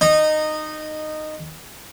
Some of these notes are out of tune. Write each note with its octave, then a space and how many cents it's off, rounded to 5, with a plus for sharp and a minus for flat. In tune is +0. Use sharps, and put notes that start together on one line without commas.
D#4 -15